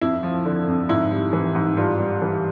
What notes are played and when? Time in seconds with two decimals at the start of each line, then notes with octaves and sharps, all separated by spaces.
0.01 F2 E4
0.23 F3
0.45 D3
0.68 F2
0.89 G#2 E4
1.11 G3
1.33 E3
1.55 G#2
1.77 G2 F4
1.99 G3
2.22 E3